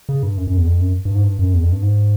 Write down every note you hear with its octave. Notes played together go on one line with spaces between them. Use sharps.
C#3
G2
F#2
F#2
E2
F2
F#2
G2
G#2
G2
F#2
E2
F2
G2
G#2